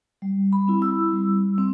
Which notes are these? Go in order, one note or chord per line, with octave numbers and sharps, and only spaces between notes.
G3
B5
C4 E4
E6
G3
C4